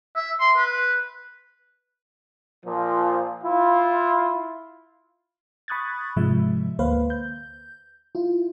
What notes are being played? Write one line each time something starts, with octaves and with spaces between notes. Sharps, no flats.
E5
C6
B4
A#2 F3
E4 F4
B5 C#6 D#6 F#6 G#6 A6
G#2 C3 F3 G#3 E5
D2 A#3 B4 C5 F5
G6
E4 F4